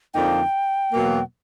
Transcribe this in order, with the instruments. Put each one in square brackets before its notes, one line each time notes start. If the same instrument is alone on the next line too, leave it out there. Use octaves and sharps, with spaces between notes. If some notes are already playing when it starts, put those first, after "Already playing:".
[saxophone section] F2 D3 F3 A#3 D#4 [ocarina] G5
[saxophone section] E2 B2 F#3 A#3